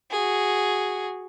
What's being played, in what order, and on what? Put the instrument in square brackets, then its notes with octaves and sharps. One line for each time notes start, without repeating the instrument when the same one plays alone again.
[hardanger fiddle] F#4 G#4